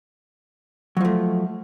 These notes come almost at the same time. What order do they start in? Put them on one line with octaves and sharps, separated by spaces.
F#3 F3 A3